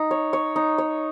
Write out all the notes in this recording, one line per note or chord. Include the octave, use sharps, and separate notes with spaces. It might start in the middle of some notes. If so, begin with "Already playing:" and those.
Already playing: D#4
C#5
C#5
D#4
C#5